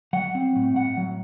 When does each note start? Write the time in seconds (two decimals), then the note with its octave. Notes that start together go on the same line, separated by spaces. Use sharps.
0.13 F#3 F#5
0.35 C4
0.56 A2
0.76 A2 F#5
0.97 F#3